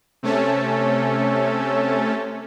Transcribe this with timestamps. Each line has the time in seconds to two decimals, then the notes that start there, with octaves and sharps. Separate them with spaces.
0.23 C3 A3 C#4 A4